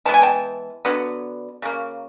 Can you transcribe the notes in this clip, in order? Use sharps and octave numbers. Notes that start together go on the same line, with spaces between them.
E3 G#3 B3 A5
G#5
G5 A5
D3 F#3 B3
C#3 F#3 A#3